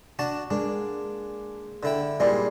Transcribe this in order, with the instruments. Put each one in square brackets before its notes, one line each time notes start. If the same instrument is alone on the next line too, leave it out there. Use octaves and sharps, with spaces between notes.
[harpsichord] D4 F#4 A5
[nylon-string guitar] G#3 A#3 [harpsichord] D4
[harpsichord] D3 E4 G5
[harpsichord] A#2 G3 G#3 [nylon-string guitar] E4 D5